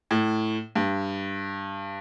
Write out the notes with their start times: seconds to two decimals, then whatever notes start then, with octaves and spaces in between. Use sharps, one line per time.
0.11 A2
0.76 G2